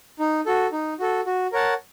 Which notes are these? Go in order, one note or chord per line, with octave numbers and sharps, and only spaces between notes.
D#4
F#4 A4
D#4
F#4 A4
F#4
A#4 C#5 F#5 A5